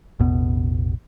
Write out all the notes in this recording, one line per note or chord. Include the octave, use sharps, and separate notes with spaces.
A1 E2 B2 B3